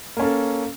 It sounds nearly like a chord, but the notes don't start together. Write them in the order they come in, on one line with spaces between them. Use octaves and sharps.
A#3 C#4 A4